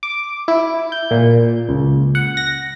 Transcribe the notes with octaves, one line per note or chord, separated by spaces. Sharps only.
D6
E4
G6
A#2
C#2
F#5
A#6